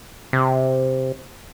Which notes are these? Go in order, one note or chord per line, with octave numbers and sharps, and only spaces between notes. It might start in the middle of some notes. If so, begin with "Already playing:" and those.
C3